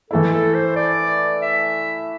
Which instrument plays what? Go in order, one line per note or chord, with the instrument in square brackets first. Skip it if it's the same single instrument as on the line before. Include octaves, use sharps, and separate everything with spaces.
[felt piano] E3 A3 E4 [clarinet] A4
[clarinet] A4
C5
D5
E5